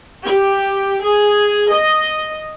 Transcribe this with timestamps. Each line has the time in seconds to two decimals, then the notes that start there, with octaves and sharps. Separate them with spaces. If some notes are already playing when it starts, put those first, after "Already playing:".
0.24 G4
1.04 G#4
1.69 D#5